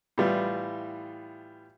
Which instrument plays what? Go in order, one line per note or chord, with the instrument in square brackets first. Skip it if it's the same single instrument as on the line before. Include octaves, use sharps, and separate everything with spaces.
[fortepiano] A2 E3 G3 B3 F4